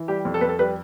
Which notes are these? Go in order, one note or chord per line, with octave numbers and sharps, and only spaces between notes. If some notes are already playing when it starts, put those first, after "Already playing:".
Already playing: E3
G3 G4
F2
A4
F2 B4
A4
G3 B4